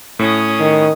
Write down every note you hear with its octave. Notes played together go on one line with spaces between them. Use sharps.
A2 C#4 D#6
D#3